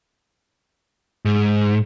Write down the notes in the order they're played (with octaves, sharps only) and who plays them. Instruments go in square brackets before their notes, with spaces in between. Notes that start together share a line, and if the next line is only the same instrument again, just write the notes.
[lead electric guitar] G#2